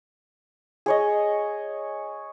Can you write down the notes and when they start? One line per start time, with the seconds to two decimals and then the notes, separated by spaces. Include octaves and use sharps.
0.86 G#4 C#5 D#5